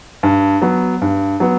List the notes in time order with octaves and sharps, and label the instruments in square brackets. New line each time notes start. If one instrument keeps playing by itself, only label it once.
[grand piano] G2
F#3 B3
G2
F#3 B3